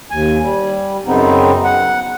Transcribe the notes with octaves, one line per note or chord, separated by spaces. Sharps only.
D#2 G#5
G3
F#2 C#3 B3 C4 D#4
F#5